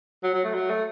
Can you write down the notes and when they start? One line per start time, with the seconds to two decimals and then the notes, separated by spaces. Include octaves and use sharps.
0.23 F#3
0.34 F#3
0.44 A3
0.54 F#3
0.70 A3